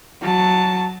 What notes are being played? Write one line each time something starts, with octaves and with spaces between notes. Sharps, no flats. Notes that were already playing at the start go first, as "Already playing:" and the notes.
F#3 A5